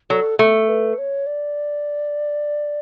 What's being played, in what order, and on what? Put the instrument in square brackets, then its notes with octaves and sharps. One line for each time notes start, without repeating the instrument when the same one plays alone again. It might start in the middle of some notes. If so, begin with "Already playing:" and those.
[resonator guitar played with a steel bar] F#3 [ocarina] A4
[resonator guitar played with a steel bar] A3 [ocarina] A4
[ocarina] B4
C#5
D5